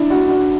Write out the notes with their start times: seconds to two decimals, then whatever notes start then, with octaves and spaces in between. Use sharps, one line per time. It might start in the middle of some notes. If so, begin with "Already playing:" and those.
Already playing: D4 E4
0.10 F#4
0.28 F#4